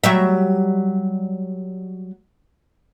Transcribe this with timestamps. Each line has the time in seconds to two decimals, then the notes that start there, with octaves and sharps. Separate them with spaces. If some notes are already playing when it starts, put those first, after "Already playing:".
0.04 F#3 G3 E5